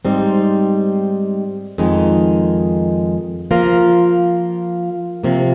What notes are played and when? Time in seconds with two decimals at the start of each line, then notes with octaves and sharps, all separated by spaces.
0.05 G#2 G3 C4 D#4
1.78 F2 D#3 G#3 D#4
3.51 F3 A#3 F4 A#4
5.24 C3 F3 A#3